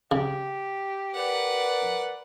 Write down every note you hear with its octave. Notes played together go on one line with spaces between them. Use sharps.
C#3 G4
A#4 B4 D5 F#5